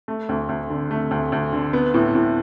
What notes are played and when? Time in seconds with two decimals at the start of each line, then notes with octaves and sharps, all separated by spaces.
0.08 A3
0.29 D2
0.49 D2
0.70 D3
0.91 A3
1.11 D2
1.32 D2
1.53 D3
1.73 B3
1.94 A2
2.15 A2